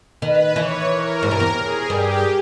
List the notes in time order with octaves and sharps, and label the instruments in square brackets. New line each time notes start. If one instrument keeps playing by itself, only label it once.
[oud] D#3 [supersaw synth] B4
[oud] E3 [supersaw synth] C#5
[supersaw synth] A#4
[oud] G#2
G2
E2
[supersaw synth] G#4
[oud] G2 [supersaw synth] G4